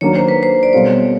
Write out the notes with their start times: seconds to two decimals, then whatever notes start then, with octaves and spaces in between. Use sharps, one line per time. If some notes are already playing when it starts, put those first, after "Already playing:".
0.01 D#3 F#3 A#3 D4 C#5
0.15 C5
0.28 B4
0.43 C5
0.63 D5
0.73 B2 G3 C4 F4 A4 C#5